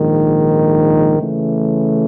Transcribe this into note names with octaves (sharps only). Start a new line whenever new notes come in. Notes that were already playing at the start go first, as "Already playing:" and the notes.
Already playing: A#1 G#2 D#3
C#3 E3 A3